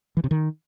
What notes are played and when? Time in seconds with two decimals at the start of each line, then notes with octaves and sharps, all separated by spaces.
0.17 E3
0.24 C3
0.31 D#3